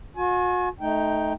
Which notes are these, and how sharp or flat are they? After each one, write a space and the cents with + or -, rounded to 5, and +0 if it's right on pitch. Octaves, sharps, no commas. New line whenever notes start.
F#4 -40 G#5 +35
A3 -20 D#4 +0 G5 +0